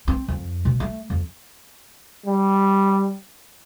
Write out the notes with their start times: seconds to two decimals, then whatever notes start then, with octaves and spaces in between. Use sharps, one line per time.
0.08 C4
0.28 F2
0.65 B2
0.80 A3
1.10 F2
2.26 G3